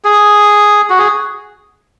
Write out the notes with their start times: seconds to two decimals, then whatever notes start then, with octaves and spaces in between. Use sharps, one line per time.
0.04 G#4
0.90 F#4
0.99 G#4